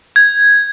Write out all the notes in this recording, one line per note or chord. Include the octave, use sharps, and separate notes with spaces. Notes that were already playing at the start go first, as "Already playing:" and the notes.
G6 G#6